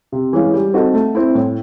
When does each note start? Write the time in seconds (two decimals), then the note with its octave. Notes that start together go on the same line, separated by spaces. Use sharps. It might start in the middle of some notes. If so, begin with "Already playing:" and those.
0.12 C3
0.33 E3 G#3 C#4 F4
0.54 G3
0.74 C4 D#4 F#4 A4
0.94 A3
1.15 C4 E4
1.35 A2